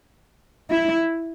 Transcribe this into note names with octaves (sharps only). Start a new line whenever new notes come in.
E4